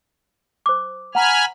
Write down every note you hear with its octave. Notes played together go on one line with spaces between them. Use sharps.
C5 D6
F#5 G#5 A#5 B5 F6